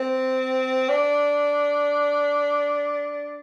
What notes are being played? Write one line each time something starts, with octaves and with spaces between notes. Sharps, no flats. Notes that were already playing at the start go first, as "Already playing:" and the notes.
Already playing: C4
D4